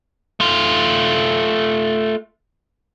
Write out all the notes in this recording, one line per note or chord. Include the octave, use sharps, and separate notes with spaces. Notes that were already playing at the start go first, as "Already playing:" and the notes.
A3 F4